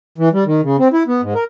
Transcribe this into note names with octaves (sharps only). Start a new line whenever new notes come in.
E3
G3
D#3
C#3
C4
E4
B3
G#2
A#4